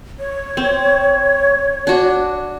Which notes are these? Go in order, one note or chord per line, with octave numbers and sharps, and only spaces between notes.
C#5
C4
D4 F#4